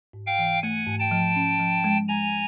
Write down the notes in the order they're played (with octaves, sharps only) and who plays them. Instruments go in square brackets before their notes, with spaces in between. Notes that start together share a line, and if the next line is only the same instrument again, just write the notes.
[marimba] G#2
[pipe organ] F5 G5
[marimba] E3
[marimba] A3 [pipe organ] F#5 G#5
[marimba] G#2
[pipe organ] G5 A5
[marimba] F3
C#4
F3
G#3
[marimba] G#3 [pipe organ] G#5 A#5